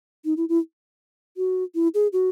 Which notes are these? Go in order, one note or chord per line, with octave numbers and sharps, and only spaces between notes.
D#4
E4
E4
F#4
E4
G#4
F#4